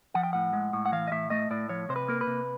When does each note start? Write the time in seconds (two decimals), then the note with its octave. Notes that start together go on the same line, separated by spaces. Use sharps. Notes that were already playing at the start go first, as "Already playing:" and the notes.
0.14 F3 F#5
0.23 G5
0.33 A2 F#5
0.53 G#3
0.73 A2
0.86 F#5
0.92 E3 F5
1.08 D#5
1.12 A2 E5
1.30 A3 D#5
1.51 A2 D5
1.69 F3 C#5
1.89 C3 C5
1.96 B4
2.08 A#3 A#4
2.21 B4
2.27 C3